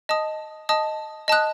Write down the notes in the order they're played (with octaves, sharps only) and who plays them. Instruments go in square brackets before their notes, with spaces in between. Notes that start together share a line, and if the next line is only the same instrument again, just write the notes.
[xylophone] D#5 A5 D#6
D#5 A5 D#6
D#5 A5 D#6 F#6